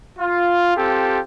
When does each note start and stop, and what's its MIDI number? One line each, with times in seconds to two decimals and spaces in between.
0.19 0.73 65
0.77 1.20 60
0.77 1.20 65
0.77 1.20 67
0.77 1.20 69